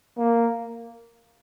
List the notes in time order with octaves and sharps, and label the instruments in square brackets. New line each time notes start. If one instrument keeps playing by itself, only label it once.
[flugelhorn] A#3